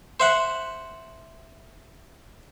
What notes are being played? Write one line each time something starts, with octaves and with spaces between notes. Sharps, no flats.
C5 E5 F#5